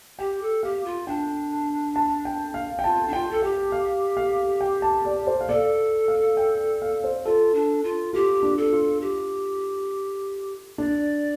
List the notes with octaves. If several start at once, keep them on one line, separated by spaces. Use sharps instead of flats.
G4 G5
A4
G4 F5
F4
D4 G5
A5
G5
F5
G5
F4 A5
D4
F4 G5
A4
G4 G5
F5
F5
G5
A5
D5
C5
F5
A4 D5
F5
G5
F5
C5
F4 A4
D4
F4
F4 G4
D4
A4
F4
G4
D4 D5